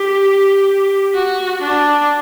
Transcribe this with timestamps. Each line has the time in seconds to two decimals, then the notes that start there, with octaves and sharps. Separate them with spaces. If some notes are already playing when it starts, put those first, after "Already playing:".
Already playing: G4
1.15 F#4
1.62 D4